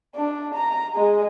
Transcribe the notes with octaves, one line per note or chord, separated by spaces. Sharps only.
D4
A#5
G#3